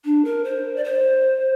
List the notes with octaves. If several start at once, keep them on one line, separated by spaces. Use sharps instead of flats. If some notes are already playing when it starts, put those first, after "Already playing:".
D4
A#4
C5
D5
C5